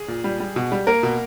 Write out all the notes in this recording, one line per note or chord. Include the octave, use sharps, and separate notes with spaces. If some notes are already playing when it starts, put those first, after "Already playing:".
Already playing: G#4
A#2
G3
G3
B2
G3
A#3 A#4
B2